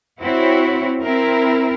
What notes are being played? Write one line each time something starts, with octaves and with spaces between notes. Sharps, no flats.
C4 E4 F#4 C#5
C4 E4 A#4